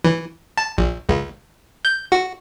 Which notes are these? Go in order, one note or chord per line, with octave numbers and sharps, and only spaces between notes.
E3
A5
A#1
C#2
G6
F#4